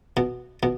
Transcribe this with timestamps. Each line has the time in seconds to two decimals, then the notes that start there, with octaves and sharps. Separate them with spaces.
0.17 B2
0.63 B2